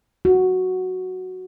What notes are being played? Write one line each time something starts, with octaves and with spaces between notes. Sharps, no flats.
F#4